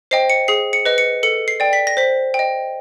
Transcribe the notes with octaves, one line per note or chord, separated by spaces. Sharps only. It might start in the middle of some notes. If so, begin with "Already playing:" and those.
C5 D#5 G5 C7
C#7
G#4 C7
C#7
B4 D#5
C#7
A4 C#7
C7
D5 G5
B6
A#6
C5 B6
G5
D#5